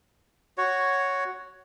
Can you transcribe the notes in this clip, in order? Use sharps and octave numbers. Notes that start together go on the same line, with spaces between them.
F#4 C#5